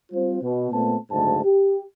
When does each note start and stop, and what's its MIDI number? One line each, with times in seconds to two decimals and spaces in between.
0.12 0.42 55
0.12 0.42 60
0.12 0.42 65
0.12 0.42 72
0.42 0.69 47
0.72 0.96 46
0.72 0.96 57
0.72 0.96 59
0.72 0.96 60
0.72 0.96 81
1.11 1.41 30
1.11 1.41 38
1.11 1.41 44
1.11 1.41 81
1.43 1.80 67